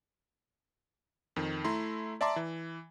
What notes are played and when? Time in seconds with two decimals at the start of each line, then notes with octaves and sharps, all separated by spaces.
1.36 F2 D#3
1.65 A3 E4 A#5 C6
2.21 D5 E5 A5 A#5 C6 D6
2.36 E3